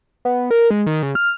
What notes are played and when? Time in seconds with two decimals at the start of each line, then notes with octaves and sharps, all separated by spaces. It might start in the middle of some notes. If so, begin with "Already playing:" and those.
0.25 B3
0.51 A#4
0.71 G#3
0.86 D#3
1.03 C#3
1.15 F6